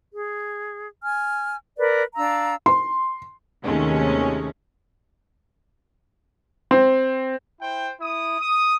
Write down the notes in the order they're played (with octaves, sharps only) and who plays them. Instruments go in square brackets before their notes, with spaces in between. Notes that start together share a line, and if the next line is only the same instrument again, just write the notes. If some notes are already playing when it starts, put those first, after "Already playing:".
[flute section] G#4
G#5 F6
A#4 B4 D5
D4 F5 A#5 E6
[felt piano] C6
[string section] D#2 C3 D#3 G#3 A3 C#4
[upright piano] C4
[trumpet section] E4 C5 G5
E4 D#6
D#6